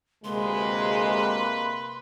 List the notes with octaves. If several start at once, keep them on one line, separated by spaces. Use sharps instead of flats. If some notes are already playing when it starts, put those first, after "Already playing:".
D2 C3 G#3 A#3 B4 C6